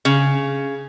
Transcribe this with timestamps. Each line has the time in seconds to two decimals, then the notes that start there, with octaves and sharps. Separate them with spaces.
0.05 C#3